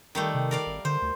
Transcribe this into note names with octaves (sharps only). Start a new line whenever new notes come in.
D#3 G3 A3
C3
A#4 D5 F5
G#1
D3 C5
D2